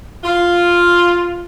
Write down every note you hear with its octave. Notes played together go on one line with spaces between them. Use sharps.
F4